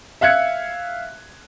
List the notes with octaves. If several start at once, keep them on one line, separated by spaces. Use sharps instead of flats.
E5 F5 F#6 G#6 C#7